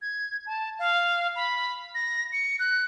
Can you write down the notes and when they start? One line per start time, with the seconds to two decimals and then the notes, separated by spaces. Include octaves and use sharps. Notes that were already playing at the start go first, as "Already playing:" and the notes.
0.02 G#6
0.46 A5
0.79 F5
1.36 B5
1.95 A#6
2.33 C#7
2.59 F#6